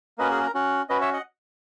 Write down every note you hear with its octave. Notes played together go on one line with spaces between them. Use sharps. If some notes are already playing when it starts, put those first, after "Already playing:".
A#3 C#4 F#4 B4 D#5
G#4
A#4
C#4 F#4
C#4 F#4 B4 D#5
C#5 E5
D#5 F#5